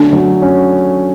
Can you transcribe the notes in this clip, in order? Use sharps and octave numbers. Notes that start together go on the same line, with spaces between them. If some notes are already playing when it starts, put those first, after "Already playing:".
Already playing: D3 F#3 A3 C#4 D4
F#3
C#4